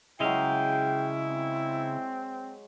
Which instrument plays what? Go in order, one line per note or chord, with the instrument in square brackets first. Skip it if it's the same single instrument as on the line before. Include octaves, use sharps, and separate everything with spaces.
[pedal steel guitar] C#3 D#5 F5 [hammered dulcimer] F#3 G#3 [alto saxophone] E4 [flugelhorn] G5
[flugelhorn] C4